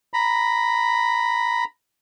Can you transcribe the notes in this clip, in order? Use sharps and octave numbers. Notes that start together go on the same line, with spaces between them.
A#5 B5